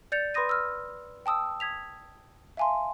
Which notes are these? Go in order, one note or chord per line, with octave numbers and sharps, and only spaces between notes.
D5 G6 A6 C#7 F7
B4 B5 C6 D#6 A#6 D#7
E6 F6
G5 A5 D#6 E6
D#6 G#6 B6 F7
E5 F5 G#5 A5 C6